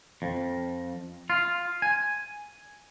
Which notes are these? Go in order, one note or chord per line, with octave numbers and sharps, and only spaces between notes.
F2
F4
G#5